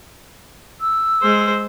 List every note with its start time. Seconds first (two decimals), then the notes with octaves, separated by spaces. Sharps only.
0.81 E6
1.23 G#3 C5